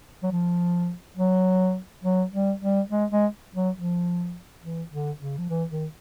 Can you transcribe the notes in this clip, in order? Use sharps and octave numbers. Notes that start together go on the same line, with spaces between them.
F#3
F3
F#3
F#3
G3
G3
G#3
G#3
F#3
F3
E3
D3
C#3
F3
E3
D#3